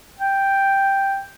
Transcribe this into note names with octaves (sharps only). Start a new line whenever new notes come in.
G5